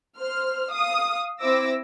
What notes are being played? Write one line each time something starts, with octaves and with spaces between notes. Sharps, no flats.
C5 F6
F5 D#6
C4 E4 C5 D6 E6 A#6